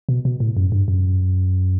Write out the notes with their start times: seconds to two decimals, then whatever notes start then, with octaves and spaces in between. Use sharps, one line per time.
0.09 B2
0.25 B2
0.40 A2
0.57 F#2
0.72 G2
0.88 F#2